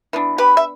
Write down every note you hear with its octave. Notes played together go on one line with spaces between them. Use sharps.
E3 B3 D4
G4 B4
E5